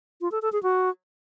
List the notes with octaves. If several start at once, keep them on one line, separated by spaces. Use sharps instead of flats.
F4
A4
A4
G#4
F#4